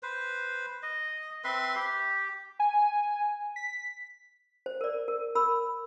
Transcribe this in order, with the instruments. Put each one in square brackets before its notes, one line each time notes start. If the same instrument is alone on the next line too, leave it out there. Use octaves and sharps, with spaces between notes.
[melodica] B4 C5
D#5
C4 B4 E5 C6
G4
[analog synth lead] G#5
B6
[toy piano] C5
A#4 D5
A#4
A#4 B5 E6